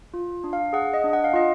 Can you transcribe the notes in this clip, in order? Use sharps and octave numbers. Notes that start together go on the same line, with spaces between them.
F4
D4
F5
G#4 F#5
D#5
D4
F#5
F5
F4 D#5